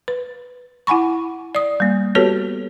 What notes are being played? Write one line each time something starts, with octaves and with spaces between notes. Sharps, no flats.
B4
E4 F#5 G#5 B5 C#6
D5 D#6
G3 A#3
B3 F#4 G4 A4 B4 C#5